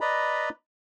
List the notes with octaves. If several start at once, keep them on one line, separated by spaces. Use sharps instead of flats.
B4 D5 D#5 A#5 B5